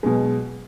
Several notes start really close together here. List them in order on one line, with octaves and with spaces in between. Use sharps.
G#3 B2 F#3